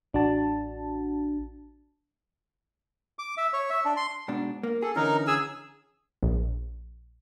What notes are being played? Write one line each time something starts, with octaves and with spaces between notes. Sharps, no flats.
A1 D4 F#4 A5
D6
E5
C#5
E5
D4
C6
G#2 B2 D4
A#3
G#4 A4
D3 E3 C#4 D#4 A#4
G#4 G#5 E6
A#1